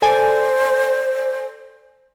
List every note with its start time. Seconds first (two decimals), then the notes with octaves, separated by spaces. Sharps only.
0.02 A4 C5 D5 G#5